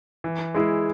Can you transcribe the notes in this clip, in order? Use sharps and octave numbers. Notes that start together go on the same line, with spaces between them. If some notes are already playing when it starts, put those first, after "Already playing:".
E3
G#3 E4 G#4